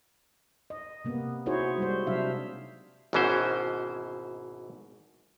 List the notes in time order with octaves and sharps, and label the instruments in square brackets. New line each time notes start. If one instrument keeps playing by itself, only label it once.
[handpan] D#5
C3 A#3 B3
D#4 E4 F#4 G#4 C5 C#5
G3 G#3 C5
C3 F#3 D4 E5 F5
[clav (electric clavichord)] G#1 G#2 B2 E3 C#4 C5